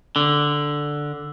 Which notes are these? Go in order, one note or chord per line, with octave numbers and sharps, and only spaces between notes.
D3